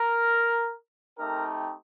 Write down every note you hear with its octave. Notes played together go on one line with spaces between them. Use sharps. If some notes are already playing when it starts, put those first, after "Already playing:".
Already playing: A#4
A3 C4 D#4 G4 A#4